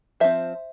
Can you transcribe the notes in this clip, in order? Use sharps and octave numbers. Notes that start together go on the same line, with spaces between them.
F3 C4 C5 E5